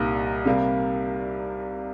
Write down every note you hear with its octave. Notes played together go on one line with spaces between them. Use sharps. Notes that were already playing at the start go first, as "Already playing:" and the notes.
Already playing: C2 A#2 G3 A#3 D#4
C3 G3 A#3